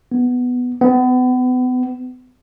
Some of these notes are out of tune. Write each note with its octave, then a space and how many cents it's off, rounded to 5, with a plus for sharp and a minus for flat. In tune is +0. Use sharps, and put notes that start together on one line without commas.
B3 +5
B3 +35